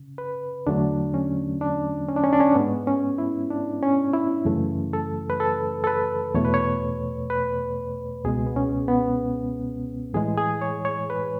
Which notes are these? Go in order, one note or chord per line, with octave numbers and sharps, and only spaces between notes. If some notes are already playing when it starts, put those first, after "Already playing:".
Already playing: C#3
B4
E2 D3 F#3 A3 D4
C#4
D4
C#4
D4
C#4
D4
C#4
G#2 G#3 B3
C#4
E4
D4
C#4
E4
F#2 C#3 E3 A3
A4
B4
A4
A4
B4
E2 B2 A3 C#5
B4
C#5
B4
C#2 B2 G#3 G#4
B3
C#4
B3
A2 E3 G#3 G#4
G#4
C#5
C#5
B4